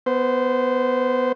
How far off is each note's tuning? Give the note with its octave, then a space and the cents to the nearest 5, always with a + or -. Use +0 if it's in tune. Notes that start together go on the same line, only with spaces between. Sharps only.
B3 +5 C5 -15